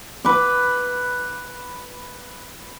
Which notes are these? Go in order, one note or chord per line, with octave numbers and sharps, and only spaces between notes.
B4 D6